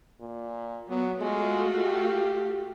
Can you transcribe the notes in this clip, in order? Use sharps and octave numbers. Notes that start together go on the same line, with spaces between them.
A#2
F#3 B3
G#3 A3 F4 F#4
G4